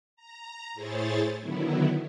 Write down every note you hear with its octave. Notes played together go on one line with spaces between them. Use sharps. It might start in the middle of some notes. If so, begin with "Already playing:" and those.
A#5
A2 E4 G#4 C5 C#5 A6
D3 D#3 F#3 B3 E4